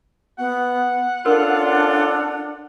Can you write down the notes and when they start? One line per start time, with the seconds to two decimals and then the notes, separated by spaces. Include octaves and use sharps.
0.38 B3 F#5
1.26 C#4 D4 F4 A4 A#4